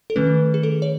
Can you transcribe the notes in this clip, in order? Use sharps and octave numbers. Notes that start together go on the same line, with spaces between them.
A4
D#3 A3 C#4 B4
G#4
A4
C#5